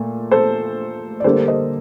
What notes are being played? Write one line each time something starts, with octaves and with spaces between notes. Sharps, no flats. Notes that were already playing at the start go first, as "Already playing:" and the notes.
Already playing: A#2 A3
A4 C5
D5
D3 G3 A#3 D4 A4 C5
C5 D#5